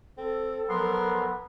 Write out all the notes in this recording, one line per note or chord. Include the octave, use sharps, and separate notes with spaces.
C4 A4
F3 F#3 B3 A#4 C6